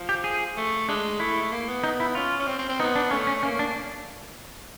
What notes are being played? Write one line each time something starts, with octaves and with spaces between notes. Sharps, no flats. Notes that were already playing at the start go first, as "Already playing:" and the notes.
Already playing: F3
G4
G#4
A3
G#3 D4
A3 E4
A#3
B3
D#4
E4
C#4 F4
C#4
C4
C4
C4
B3 D#4
D4
A3 C#4
C#4
A#3 C#4
D4